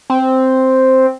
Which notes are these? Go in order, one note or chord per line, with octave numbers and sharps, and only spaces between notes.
C4